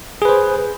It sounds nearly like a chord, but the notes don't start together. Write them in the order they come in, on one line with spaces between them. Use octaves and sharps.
G#4 B4 C5